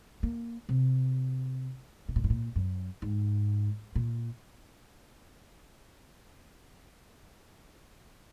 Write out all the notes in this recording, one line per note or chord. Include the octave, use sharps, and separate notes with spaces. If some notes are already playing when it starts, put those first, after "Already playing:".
A#3
C3
C3
A#2
G#2
A#2
F#2
G#2
A#2